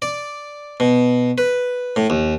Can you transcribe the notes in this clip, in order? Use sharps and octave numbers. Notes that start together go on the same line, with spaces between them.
D5
B2
B4
A2
D#2